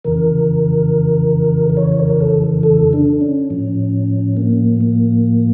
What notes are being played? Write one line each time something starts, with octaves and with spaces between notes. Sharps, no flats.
F2 C#3 E3 A#4
A#4
C#5
A#4
A4
A4
D4
C#4
A2 F3
A#3
A#3